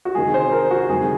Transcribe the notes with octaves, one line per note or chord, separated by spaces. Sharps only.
F#4
C3 D#3 G#3 G#4
C5
A#4
F#4
C3 D#3 G#3 G#4